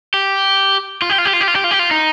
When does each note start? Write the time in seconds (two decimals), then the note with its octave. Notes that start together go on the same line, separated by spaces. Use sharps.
0.14 G4
1.02 F4
1.09 G4
1.18 F4
1.25 G4
1.33 F4
1.41 G4
1.48 F4
1.56 G4
1.64 F4
1.71 G4
1.79 F4
1.91 D#4